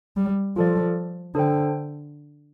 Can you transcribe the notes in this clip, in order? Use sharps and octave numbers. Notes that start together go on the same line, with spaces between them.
G3
F3 F4 A4 D5
D3 D4 A4 C5 G5